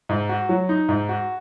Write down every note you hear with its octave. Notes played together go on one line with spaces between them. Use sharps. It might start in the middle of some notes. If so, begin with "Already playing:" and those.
G#2
F#4
F#3
D#4
G#2
F#4